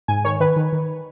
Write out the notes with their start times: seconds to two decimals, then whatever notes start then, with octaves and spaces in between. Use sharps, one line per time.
0.08 G#2 G#5
0.25 D#3 C#5
0.40 D#3 B4
0.56 D#3
0.73 D#3